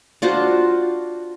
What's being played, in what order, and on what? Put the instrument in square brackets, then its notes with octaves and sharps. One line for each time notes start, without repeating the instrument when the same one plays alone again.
[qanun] D4 F4 F#4 C5